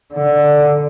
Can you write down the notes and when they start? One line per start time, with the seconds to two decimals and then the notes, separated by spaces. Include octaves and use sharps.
0.14 D3